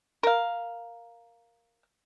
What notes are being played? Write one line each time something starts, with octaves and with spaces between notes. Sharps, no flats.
A#4 F5